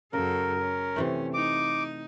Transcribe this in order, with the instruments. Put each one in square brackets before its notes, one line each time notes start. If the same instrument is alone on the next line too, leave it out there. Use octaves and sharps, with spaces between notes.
[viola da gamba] F#2 A4 [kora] C#3 [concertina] A#4
[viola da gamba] C#4
[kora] C3 E3 A3
[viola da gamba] D#4 [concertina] D6